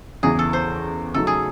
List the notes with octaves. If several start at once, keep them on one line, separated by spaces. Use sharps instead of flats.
E2 C#3 E3 G#4
A4
C5
C#3 F#3 A3 D#4 A4
G#4